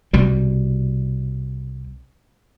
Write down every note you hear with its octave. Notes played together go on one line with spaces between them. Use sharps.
C2 B2 G3